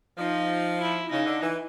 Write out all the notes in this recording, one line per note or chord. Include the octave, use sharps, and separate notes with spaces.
F3 D#4
E4
C#3 D#4
D3
E3